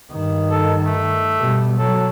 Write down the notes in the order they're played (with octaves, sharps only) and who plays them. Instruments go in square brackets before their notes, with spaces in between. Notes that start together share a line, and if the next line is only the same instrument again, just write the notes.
[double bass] G2 D#3
[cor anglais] A4
A3
[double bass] B2 G3
[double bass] F#3 [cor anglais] A4